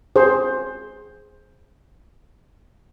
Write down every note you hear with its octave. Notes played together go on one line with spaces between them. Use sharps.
G#4 C5